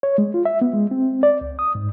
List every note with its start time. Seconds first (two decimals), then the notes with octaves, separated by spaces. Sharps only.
0.03 C#5
0.18 G#3
0.34 F4
0.45 E5
0.61 B3
0.73 G#3
0.91 C4
1.23 D5
1.41 C#2
1.59 D#6
1.75 G#2